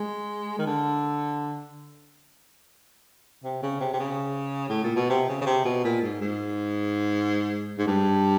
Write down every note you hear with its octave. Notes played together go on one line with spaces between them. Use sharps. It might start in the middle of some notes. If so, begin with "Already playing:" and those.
Already playing: G#3
D#3
D3
C3
C#3
C3
C3
C#3
A2
A#2
B2
C3
C#3
C#3
C3
B2
A#2
G#2
G#2
G#2
G2